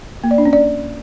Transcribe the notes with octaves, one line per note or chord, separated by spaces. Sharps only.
A#3
D5
D4
C#4
D5